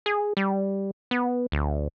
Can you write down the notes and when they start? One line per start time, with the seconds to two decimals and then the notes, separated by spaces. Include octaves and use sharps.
0.06 G#4
0.37 G3
1.11 B3
1.52 D2